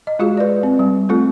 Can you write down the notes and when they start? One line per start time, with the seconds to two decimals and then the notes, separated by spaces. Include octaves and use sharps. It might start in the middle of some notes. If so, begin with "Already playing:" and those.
0.07 D#5
0.19 G#3 F4 F#4 G#4 F5
0.37 B4 D5
0.63 C4
0.79 G3
1.09 A3 C4 F4 A4